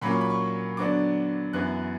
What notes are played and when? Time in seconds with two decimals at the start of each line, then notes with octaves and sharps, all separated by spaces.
0.01 A#2 F#3 A#3 C#4 B5
0.11 C#6
0.21 B5
0.30 C#6
0.77 D3 F#3 B3 D4 D6
1.53 F#2 E3 B3 F#6